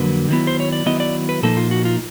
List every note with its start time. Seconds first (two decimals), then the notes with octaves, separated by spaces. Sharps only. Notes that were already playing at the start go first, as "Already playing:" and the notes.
Already playing: F2 D3 F#3 A#3 B4
0.28 D#3 F#3 B3 E4
0.47 C5
0.60 C#5
0.72 D5
0.86 D#3 F#3 B3 E4 D#5
1.00 D5
1.29 B4
1.43 A#2 F3 A#3 D#4 A4
1.57 F4
1.71 F#4
1.85 F4